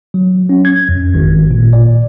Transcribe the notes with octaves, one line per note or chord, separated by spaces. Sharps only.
F#3
C#4
G#6
F2
G#1
A#2
D5